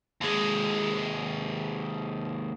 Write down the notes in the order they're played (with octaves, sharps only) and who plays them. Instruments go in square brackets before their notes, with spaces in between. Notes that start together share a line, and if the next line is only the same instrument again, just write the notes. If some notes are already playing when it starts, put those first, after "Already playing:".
[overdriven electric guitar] D#2 G#3